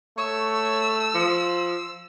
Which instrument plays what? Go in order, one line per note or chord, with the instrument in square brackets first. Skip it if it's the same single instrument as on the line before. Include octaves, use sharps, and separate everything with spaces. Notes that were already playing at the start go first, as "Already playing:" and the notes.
[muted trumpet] A3 [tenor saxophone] C#5 [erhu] E6
[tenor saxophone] F3